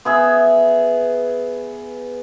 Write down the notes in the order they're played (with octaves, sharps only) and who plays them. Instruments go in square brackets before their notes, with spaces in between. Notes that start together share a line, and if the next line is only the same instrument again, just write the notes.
[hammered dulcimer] B3 G#4 E5